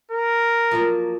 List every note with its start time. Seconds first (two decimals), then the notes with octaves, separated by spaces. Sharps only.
0.12 A#4
0.71 F3 F#3 A#3